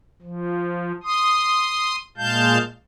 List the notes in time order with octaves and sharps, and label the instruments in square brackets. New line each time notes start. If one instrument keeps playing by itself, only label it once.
[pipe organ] F3
C6 D#6
A#2 G#3 F5 A5 G6